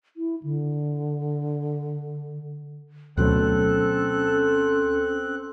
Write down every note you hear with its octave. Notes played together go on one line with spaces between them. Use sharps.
E4
D3
D2 B2 F#3 C4 C#4 A4 F#6